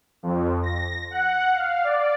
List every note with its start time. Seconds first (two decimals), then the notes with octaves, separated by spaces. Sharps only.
0.23 F2
0.63 A#6
1.11 F#5
1.53 F5
1.84 D5